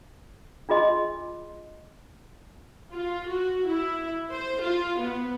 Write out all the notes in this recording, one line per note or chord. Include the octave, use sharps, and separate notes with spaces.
D4 F4 G#4 D#5 C6
F4
F#4
E4
C5
F4
B3